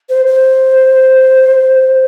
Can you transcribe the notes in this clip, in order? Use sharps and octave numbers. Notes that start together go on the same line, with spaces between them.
C5
C5